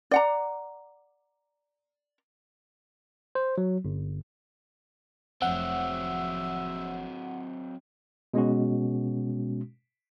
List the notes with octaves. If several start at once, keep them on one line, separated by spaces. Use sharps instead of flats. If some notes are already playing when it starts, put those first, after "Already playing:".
D5 F#5 A#5
C5
F#3
G1
F1 F3 F#3 C4 E5 F#5
B2 G#3 C#4 F#4